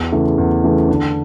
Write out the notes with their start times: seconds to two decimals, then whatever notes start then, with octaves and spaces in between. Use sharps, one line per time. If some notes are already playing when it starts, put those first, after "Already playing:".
Already playing: E2
0.12 C#3 E3 A3
0.38 E2
0.63 C#3 E3 A3
0.89 D3